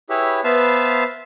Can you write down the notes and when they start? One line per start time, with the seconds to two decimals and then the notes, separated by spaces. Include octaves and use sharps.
0.09 E4 G4 G#4 B4 C#5 E5
0.44 B3 B4 C5 E5 F5 A5